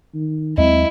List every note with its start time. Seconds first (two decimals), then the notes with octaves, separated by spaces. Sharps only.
0.14 D#3
0.58 D#2 F#3 G#3 C4 E4 D#5